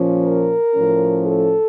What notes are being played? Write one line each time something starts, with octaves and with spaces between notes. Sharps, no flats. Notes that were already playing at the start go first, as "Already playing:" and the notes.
Already playing: A#2 F3 C#4
A#4
A2 F3 C#4
A4